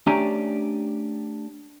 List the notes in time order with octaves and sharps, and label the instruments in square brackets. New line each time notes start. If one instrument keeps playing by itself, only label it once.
[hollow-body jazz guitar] A3 C#4 D4 G4 G#5 A#5